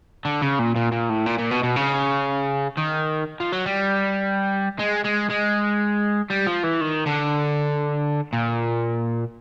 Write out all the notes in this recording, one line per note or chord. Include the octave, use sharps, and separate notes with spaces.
D3
C#3
A#2
A#2
A#2
A2
A#2
A#2
B2
B2
C#3
D#3
F3
F#3
G3
G#3
G#3
G#3
G3
F3
E3
D#3
D3
A#2